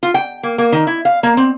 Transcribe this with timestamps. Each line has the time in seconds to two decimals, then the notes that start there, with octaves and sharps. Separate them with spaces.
0.03 F4
0.14 G5
0.43 A#3
0.58 A#3
0.72 D#3
0.87 E4
1.05 F5
1.23 A#3
1.37 C4